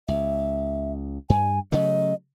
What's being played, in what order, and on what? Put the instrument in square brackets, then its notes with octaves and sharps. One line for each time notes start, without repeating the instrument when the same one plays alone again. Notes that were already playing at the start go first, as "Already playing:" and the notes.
[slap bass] C#2 [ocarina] E5
[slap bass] G2 [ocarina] G#5
[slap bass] C#3 F#3 A3 [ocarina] D#5